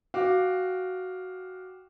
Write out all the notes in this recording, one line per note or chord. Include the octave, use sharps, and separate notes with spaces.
F#4 F5 G5 D6